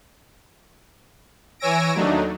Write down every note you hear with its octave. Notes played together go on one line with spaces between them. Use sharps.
E3 C#5 G#5 E6 A#6 D7
D#2 F#3 A3 D4 D#4